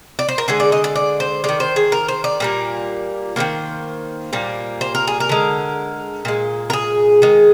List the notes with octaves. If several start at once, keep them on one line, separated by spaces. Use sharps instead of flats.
D5
C5
A#4
D3 G#3 G#4
D5
D#5
D5
D5
C5
D#3 G#3 D5
C5
G#4
A#4
C5
D5
A#2 G3 A#3
D#3 G3 A#3 C5
A#2 G3 A#3
C5
A#4
G#4
A#4
D3 G#3
A#2 G#3
A#4
G#4
D#3 G#3